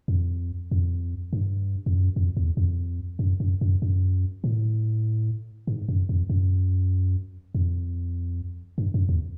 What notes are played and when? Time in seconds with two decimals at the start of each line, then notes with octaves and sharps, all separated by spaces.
0.08 F2
0.71 F2
1.33 G2
1.86 F2
1.95 F#2
2.16 F2
2.37 E2
2.57 F2
3.19 F#2
3.40 F#2
3.61 F#2
3.82 F#2
4.44 A2
5.67 G#2
5.89 F#2
6.09 F2
6.30 F#2
7.55 F2
8.78 G2
8.94 F#2
9.09 E2